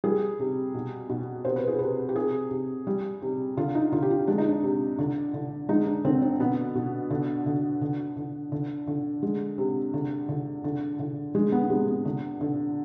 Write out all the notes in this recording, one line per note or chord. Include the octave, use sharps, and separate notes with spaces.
G3 G#4
C3
B2
B2
C3 C5
B4
G#4
C3 B4
G4
C3 G#4
C3
G3
C3
D3 F4
D#4
D3 F4
G4
F4
G#3 D4
D#4
D4
C3
D3
D3
G#3 D#4
D4
D3 C4
C4
B2 B3
B2
D3
D3
D3
D3
D3
D3
G#3
C3
D3
D3
D3
D3
G#3
B3
B3
C3 G#3
B3
D3
D3